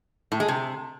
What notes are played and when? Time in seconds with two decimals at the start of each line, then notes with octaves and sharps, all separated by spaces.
0.32 A2
0.40 G#3
0.48 C3